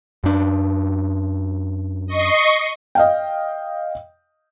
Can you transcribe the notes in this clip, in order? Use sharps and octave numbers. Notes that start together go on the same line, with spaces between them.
F#2 D4
D#5 C#6 C7
D#5 F5 G5